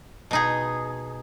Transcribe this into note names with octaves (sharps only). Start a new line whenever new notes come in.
B2 D#4 G#4